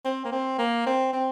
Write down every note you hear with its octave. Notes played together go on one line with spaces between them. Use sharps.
C4
A#3
C4
A#3
C4
C4